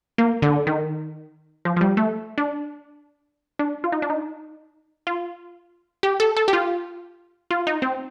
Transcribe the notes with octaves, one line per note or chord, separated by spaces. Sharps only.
A#3
D3
D#3
F3
F3
G3
A3
D4
D4
F4
D#4
D4
D#4
F4
G4
A4
A4
G4
F4
F4
D#4
C4